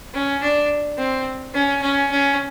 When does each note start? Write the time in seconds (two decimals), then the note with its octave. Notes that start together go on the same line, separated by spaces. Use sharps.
0.14 C#4
0.42 D4
0.98 C4
1.54 C#4
1.82 C#4
2.11 C#4